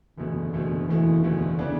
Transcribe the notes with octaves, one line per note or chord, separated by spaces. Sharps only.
F#1 E2 B2 D3 A3
F#1 E2 B2 A3
F#1 E2 B2 E3 A3
F#1 E2 B2 D3 A3
C#3 E3 B3 D4